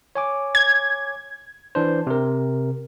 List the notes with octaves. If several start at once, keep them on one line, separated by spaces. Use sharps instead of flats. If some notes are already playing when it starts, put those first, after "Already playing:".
C#5 G#5 D6
G#6
E3 D4 C5
C3 A#4